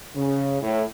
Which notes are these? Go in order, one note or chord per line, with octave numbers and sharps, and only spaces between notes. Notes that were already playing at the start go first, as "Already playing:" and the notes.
C#3
A2